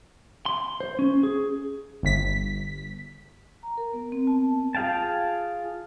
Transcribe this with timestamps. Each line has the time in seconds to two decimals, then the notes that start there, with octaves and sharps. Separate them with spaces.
0.46 C6
0.80 C5
0.99 C#4
1.23 G#4
2.03 G1 B6
3.63 A#5
3.77 A#4
3.94 B3
4.12 C4
4.27 A5
4.75 F4 G#4 F5 G5 A5